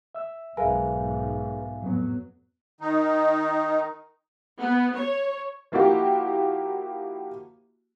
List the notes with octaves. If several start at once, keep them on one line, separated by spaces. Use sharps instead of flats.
E5 E6
B1 G#2 G#4 A#4 B4 E5 F5 G#5
F2 A2 F#3 B3
D#3 D#4
B3
C#5
F3 A#3 E4 F#4 G4